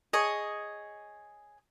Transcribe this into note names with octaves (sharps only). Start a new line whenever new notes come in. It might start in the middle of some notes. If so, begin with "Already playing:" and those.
G#4 C#5 D#5